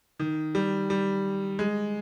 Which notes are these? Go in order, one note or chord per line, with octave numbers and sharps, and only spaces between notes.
D#3
G3
G3
G#3